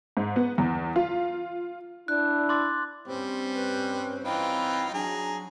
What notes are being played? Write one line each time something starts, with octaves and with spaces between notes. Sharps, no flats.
G#2
B3
E2
F4
D4 E4 F#6
C6 D6 A6
G2 G3 C4 C#4
B4
E3 D#4 F4 G5 B5
F#3 D4 G#4 A#5